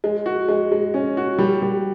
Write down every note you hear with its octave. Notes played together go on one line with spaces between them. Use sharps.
G#3
F#4
G#3
G#3
C#4
F#4
G3
G3